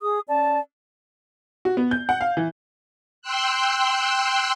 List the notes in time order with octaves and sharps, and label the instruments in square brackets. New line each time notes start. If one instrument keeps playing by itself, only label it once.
[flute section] G#4 D#6
C#4 D5 A5
[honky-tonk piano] F#4
B3
G6
F#5
F5
E3
[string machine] G5 C6 E6 F#6